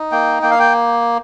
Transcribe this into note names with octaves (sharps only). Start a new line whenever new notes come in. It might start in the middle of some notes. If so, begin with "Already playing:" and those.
Already playing: D#4
A#3 G5
A#3 G5
F5
G5